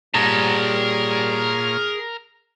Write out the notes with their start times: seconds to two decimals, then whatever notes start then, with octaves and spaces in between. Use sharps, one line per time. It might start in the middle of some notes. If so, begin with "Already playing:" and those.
0.14 A#2 G3 G#4 A#4 C#5 A5 A#5